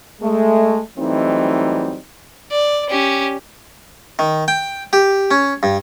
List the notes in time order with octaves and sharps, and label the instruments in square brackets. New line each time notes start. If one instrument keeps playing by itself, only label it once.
[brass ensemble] G#3 A3
E3 F#3 G3 A3 C4 D#4
[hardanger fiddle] D5
C#4 G4
[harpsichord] D#3
G5
G4
C#4
G2